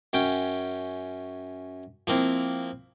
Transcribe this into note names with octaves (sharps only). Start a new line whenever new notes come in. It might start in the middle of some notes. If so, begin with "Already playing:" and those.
F#2 C#4 G5
F3 A#3 C4 E4